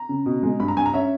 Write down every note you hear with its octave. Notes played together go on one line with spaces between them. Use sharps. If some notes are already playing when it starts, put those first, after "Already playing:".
Already playing: A#5
C#3
B2
G#3
G2 B5
A#5
G2 G#5
A#5
C#4 E5